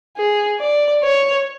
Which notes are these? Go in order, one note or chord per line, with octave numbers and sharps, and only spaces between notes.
G#4
D5
C#5